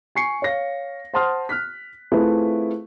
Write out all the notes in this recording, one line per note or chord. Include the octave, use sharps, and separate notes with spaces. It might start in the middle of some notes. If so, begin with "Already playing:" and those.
G#5 C#6 C7 C#7
C#5 F5 A#6
C5 F#5 A5 C6 D#6 F6
F6 F#6 B6
A3 C4 E4 F4 G#4 B4